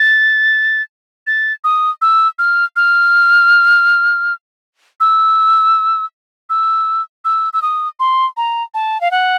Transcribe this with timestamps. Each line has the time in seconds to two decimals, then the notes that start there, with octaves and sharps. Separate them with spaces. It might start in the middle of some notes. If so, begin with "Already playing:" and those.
Already playing: A6
1.27 A6
1.64 D#6
2.02 E6
2.39 F6
2.76 F6
5.00 E6
6.50 E6
7.25 E6
7.53 E6
7.62 D#6
8.00 C6
8.37 A#5
8.74 A5
9.01 F5
9.11 F#5